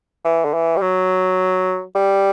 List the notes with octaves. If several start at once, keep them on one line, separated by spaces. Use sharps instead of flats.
E3
D3
E3
G3
F#3
G3